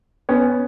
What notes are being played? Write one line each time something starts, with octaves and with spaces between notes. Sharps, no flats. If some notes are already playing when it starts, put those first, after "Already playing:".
B3 C#4